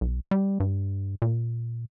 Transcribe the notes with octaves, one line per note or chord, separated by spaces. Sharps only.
B1
G3
G2
A#2